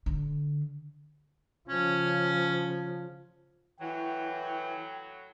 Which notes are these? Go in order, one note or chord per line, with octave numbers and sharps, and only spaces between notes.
D3
C#3 F3 C#4
A2 E3 F#3 E4 G5